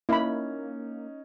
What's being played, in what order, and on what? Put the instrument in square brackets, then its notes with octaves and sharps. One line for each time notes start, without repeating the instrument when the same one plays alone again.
[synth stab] A#3 [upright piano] C#4 D#4 [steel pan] E4 B5